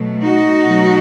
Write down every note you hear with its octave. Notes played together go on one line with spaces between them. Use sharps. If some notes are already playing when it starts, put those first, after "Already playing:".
Already playing: B2 F#3 A3
D#4 F#4
B2 F#3 A3